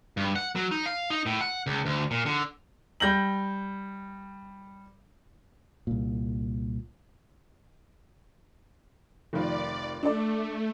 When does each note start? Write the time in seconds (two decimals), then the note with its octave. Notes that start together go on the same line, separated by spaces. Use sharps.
0.17 G2
0.36 F#5
0.56 F#3
0.71 D#4
0.86 F5
1.10 D#4
1.26 A2
1.41 F#5
1.67 C#2
1.86 D2
2.11 A#2
2.26 D3
3.00 G3 G6 A#6 F#7
5.87 C2 A#2
9.33 F1 D#3 F3 D5
10.03 A3 D4 A4 D5